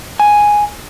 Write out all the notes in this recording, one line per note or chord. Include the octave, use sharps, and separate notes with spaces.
G#5